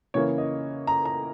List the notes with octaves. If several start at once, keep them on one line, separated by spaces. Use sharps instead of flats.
C#3 E3 A#3 C#5
D#5
A#5
A#5